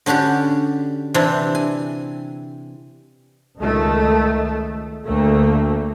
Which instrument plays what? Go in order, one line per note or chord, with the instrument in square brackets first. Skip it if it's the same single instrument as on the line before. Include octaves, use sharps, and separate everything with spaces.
[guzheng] D3 C#4 D4 F#4 G4
C3 E3 C4 D4 E4
G#5
[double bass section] C#2 D#3 A3
D2 A3 A#3